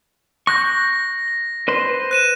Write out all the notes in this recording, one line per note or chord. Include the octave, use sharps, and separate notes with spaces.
C#6 F#6 G6 A#6
B4 C5 C6
F#6 D#7 E7